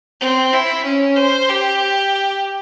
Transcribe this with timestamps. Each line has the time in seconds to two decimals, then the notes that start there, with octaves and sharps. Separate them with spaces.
0.21 C4
0.53 E4
0.84 C#4
1.16 C5
1.49 G4